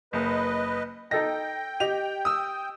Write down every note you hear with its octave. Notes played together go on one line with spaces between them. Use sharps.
F#1 B4 D#5
D#4 A4 D#5 G5 A#6
G4 D#5 F7
D#6 E6